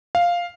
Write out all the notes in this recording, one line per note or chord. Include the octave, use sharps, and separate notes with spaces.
F5